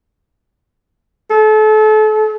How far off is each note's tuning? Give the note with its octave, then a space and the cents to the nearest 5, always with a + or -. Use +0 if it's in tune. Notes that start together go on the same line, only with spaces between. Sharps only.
A4 -35